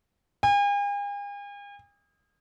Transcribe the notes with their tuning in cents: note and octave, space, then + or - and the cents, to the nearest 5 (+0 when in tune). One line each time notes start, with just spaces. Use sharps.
G#5 -45